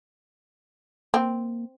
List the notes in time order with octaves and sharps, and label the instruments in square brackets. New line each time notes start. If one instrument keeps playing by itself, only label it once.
[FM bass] A#3 [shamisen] C4